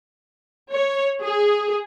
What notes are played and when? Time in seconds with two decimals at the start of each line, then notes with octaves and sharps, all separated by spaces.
0.71 C#5
1.22 G#4